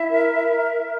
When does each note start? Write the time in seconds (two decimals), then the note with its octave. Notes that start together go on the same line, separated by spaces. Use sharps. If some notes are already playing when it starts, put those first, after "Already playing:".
Already playing: E4 E5
0.09 A#4
0.34 A#4